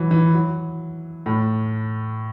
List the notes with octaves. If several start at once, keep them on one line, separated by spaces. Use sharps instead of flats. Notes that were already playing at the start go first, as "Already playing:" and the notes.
Already playing: E3 F#3
E3
F#3
A2